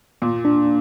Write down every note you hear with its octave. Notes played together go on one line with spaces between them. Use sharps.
A#2 A#3
D4